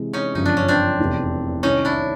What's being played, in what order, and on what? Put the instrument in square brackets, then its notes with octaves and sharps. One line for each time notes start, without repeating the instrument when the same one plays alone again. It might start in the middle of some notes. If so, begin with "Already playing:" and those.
Already playing: [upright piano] C3 E3 G#3
[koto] C#4 D#4
[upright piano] G1 F#2 C#3 F3 [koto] D#4
[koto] D4
C#4
C4 D4
[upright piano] F1 E2 C3
[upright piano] C2 C3 D#3 [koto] C#4 D#4
[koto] D4 E4